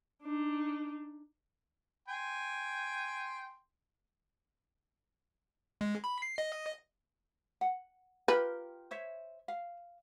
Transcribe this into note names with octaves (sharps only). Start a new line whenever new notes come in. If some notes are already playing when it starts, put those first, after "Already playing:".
D4 D#4
G5 G#5 C6
G#3
B5
C7
D#5
F#5
F4 G4 A#4 B4
C5 C#5 E5
F5